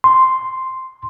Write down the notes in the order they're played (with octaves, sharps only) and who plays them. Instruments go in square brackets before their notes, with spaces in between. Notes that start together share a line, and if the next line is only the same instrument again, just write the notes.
[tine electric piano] C6